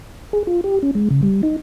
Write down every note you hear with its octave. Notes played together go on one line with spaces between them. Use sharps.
G#4
F4
G4
C#4
G#3
C#3
G3
D#4